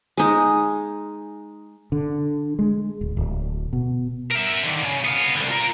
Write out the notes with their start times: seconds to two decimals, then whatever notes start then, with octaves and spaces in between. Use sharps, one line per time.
0.17 G#3 D#4
1.92 D3
2.59 G#3
3.01 D1
3.17 D1
3.73 B2
4.32 A#4 E5
4.63 D3 D#3
4.83 C#3
5.04 B3 F5
5.35 C2 D3
5.50 F4 A#4